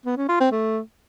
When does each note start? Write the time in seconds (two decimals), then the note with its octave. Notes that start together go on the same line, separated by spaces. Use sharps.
0.06 B3
0.17 C#4
0.29 F4
0.40 C4
0.52 A3